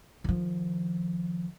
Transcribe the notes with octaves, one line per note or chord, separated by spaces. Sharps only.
D#3 F3